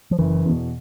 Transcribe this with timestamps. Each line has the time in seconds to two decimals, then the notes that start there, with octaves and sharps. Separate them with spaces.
0.11 F3
0.19 F#1 E3
0.46 E2 B2